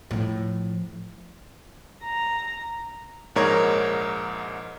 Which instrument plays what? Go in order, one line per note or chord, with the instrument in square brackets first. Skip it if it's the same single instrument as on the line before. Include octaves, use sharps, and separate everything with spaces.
[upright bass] A2 F3
[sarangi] A#5
[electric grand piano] A#1 G#2 A#4 C#5 G#6